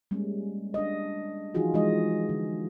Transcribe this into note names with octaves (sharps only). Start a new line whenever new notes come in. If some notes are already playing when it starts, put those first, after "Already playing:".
G3 G#3 A#3 C#4
D4 D#5
E3 F3 D#4 F4 F#4 G#4
E3 F3 G#3 D#4 D#5
D3